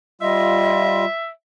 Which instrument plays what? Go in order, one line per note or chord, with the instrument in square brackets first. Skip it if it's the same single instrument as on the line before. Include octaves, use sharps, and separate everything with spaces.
[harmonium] G3 F4 [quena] D#5 [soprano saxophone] E5